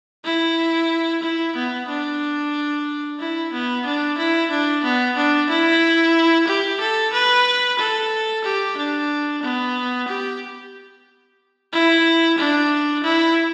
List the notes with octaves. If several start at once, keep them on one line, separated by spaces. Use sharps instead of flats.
E4
E4
B3
D4
E4
B3
D4
E4
D4
B3
D4
E4
G4
A4
B4
A4
G4
D4
B3
G4
E4
D4
E4